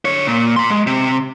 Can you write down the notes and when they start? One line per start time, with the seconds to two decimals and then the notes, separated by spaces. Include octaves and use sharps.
0.05 D3 C#5
0.27 A#2
0.56 A#5 C6
0.70 G#3
0.87 C3